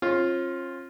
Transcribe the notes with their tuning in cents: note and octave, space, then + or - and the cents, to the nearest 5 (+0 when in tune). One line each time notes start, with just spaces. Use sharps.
C#4 -45 F4 +0